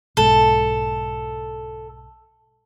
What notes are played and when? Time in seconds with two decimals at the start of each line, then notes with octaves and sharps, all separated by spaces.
0.17 B1 G#2 A4